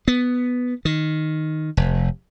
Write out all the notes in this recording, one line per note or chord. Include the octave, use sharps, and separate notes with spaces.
B3
D#3
F1